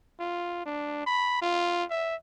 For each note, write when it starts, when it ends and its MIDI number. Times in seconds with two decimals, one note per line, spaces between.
0.19 0.63 65
0.66 1.04 62
1.06 1.39 83
1.42 1.84 65
1.90 2.15 76